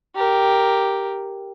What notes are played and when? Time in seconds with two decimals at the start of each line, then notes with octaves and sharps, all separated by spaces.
0.16 G4 A#4